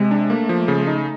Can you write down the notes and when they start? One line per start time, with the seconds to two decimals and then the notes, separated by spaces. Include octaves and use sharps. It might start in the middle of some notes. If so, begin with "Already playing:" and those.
Already playing: C3 G#3
0.11 D4
0.30 A3 A#3
0.49 F3
0.68 C#3
0.87 D#4